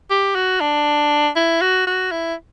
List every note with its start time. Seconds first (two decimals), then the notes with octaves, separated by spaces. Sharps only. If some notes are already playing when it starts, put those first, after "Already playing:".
0.10 G4
0.35 F#4
0.60 D4
1.36 E4
1.61 F#4
1.87 F#4
2.11 E4